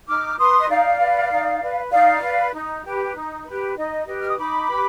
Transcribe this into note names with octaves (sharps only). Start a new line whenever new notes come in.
D#4 D6 F6
B4 C6 D#6
D#5
D#4 D5 F5
B4
D#4
B4
D#4 D5 F5
B4
D#4
G4 B4
D#4
G4 B4
D#4 D#5
G4 B4 D#5
F6
D#6
D#4 B5 D6
G4 B4